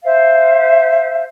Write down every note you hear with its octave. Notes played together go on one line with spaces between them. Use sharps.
C5 E5 F5